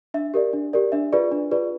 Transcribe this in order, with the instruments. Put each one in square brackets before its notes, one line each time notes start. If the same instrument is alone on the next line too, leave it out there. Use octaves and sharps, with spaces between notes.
[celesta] D4 E5
G4 A#4 D5
D4
G4 A#4 D5
D4 E5
F4 G#4 B4 D5
D4
F4 G#4 B4 D5